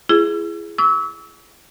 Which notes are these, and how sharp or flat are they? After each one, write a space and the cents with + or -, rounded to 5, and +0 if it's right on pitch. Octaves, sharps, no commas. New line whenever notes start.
E4 +35 G#4 +0
C#6 +45 E6 -25